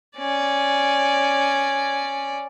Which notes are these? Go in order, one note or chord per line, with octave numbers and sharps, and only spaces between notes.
C#4 D5